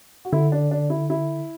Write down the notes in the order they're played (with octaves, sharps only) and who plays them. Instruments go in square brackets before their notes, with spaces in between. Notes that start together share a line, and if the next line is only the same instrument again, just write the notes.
[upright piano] F#4
[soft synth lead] D3 [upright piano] E4
[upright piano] D4
D4
E4
E4